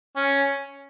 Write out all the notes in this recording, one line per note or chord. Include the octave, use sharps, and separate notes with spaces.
C#4